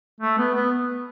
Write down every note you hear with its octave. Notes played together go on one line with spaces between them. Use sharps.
A3
B3
B3